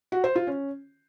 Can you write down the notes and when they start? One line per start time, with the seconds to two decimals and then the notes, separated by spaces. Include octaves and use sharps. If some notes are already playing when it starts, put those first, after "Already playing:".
0.12 F#4
0.24 C5
0.35 F4
0.47 C#4